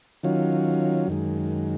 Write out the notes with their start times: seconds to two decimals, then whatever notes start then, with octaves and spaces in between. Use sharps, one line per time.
0.23 D#3 F#3 C#4 F4
1.08 F#2 D#3 G#3